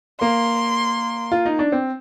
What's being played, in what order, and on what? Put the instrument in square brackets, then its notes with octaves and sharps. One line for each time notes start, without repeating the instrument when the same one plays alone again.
[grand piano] A#3 [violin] C6
[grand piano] F4
D#4
D4
C4